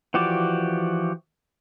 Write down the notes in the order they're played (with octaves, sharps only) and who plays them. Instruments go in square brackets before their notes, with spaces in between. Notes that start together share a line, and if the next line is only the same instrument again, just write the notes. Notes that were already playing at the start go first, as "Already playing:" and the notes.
[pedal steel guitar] E3 F3 F#4 G4 D5